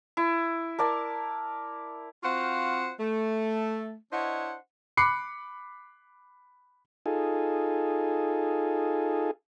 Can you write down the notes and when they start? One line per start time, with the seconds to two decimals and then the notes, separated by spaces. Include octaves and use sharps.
0.17 E4
0.79 A#4 D5 A5
2.24 C4 F4 F#4 C5 F5 F#5
2.99 A3
4.12 D4 E4 C5 C#5 D#5 F#5
4.97 B5 D6 F#6 C7 C#7
7.06 D#4 F4 G#4 A4